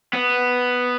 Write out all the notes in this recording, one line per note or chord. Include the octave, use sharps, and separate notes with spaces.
B3